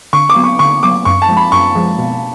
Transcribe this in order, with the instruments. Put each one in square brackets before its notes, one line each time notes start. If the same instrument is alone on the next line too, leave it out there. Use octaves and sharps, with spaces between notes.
[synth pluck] D3 [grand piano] C#6
[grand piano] D6
[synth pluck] F#3 B3
[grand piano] C#6
[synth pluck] D3 [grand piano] C#6
[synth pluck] F#3 B3 [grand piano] D6
[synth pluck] F#2 [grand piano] C#6
[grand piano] A5
[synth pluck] F3 G#3
[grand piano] B5
[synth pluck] F#2 [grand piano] C#6
[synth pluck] F3 G#3
B2